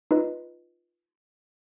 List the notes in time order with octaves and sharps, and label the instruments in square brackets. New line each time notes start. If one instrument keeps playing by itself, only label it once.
[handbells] D#4 F4 B4 D#5